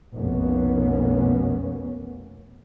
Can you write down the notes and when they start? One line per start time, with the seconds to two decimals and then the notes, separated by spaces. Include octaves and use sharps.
0.16 F1 B1 B2 A#3 B3 C#4